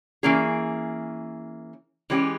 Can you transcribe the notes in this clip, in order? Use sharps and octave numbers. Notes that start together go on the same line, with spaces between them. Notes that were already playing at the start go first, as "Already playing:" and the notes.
E3 A#3 C#4 G#4
E3 G#3 C#4 G4